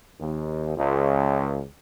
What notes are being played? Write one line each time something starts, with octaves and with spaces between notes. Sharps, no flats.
D#2
C#2